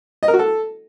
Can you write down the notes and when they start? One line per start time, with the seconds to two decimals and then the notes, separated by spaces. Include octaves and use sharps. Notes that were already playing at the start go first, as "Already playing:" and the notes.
0.23 D#5
0.28 A#4
0.34 F#4
0.39 A4